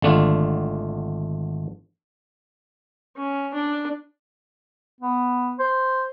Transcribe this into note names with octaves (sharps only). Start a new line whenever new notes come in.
G#1 D3 A3 D4 F4
C#4
D4
B3
C5